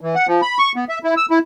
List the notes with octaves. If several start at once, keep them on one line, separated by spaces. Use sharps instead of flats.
E3
F#5
F3
B5
C#6
B3
E5
E4
E6
E4